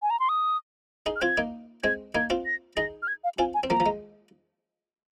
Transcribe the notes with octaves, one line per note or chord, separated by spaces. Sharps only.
G#5
A#5
C6
D#6
D#4 G#4
F6
C4 F4 G#6
A#3 D#4
G#3 C4 G#6
A#3 D#4 G#6
C4 F4
A#6
D#4 G#4 A#6
F6
G#6
F5
C4 F4 G#5
G#5
C4
F3 A#3 A#5
F3
G#3